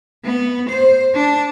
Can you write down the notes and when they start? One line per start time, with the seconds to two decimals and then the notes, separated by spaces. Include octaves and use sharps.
0.25 B3
0.69 C5
1.15 D4